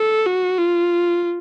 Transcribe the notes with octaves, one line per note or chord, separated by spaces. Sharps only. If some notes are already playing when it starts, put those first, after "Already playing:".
Already playing: A4
F#4
F4